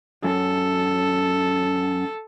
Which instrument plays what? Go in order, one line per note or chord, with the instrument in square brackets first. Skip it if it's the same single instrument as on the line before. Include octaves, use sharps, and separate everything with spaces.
[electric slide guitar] F#2 [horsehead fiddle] A4